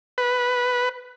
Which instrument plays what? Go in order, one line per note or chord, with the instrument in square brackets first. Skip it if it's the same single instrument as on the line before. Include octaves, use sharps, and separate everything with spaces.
[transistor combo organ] B4